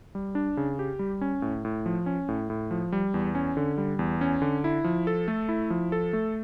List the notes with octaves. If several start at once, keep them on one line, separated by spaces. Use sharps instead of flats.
G3
D4
C#3
G4
G3
C#4
A2
A2
F3
C#4
A2
A2
F3
G3
E2
C#4
D3
G3
E2
C#4
D3
E4
F3
A4
A3
E4
F3
A4
A3